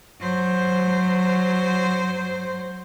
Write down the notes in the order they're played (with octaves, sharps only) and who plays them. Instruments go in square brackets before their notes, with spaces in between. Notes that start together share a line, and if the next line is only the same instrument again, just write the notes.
[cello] F#3 C5